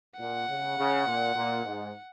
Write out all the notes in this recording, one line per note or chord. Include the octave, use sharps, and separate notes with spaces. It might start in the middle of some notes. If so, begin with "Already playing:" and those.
A#2 F#5
C#3
C#3
A#2
A#2
G#2